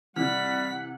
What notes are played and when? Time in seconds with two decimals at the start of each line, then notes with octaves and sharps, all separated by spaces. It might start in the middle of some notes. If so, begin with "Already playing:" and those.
0.16 C3 E3 G3 F#5 F6 B6